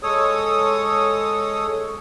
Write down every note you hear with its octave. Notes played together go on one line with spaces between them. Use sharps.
G#3 A4 C#5 D#6